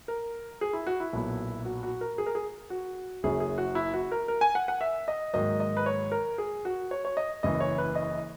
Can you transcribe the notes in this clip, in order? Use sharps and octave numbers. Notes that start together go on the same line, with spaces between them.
A#4
G#4
E4
F#4
E4
B1 A#2 F#3 B3
F#4
F#4
A#4
G#4
A#4
G#4
F#4
F#1 F#2 C#3 F#3 C#4 G#4
G#4
F#4
E4
F#4
A#4
A#4
G#5
F#5
F#5
E5
D#5
G#2 D#3 F#3 A#3 D#5
D#5
B4
C#5
A#4
G#4
F#4
C#5
C#5
D#5
F#1 F#2 C#3 E3 D#5
C#5
B4
D#5